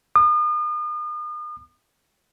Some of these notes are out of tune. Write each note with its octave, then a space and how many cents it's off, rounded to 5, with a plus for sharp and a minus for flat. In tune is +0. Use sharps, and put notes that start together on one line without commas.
D#6 -40